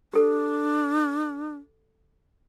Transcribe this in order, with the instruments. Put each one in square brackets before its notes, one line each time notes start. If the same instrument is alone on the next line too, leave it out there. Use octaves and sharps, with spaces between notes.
[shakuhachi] D4 [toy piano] G4 A4